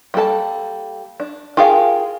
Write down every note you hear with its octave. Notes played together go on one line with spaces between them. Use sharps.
G3 A#3 A4 A5
D4
F4 G4 G#4 A#4 F5